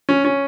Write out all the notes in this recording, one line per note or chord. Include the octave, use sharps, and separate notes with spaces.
C#4
C#4